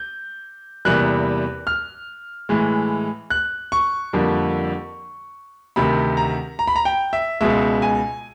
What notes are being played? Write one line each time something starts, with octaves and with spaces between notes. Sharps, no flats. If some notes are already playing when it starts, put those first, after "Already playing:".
Already playing: G6
E2 C3 E3 G3 A#3 F#6
F6
A2 E3 G#3
F#6
C#6
F2 D3 G3 A#3
D2 C3 D#3 B5
A#5
A#5
B5
A#5
G5
E5
C#2 B2 G#3 E5
G#5